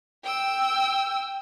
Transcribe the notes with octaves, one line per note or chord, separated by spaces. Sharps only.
G5 E6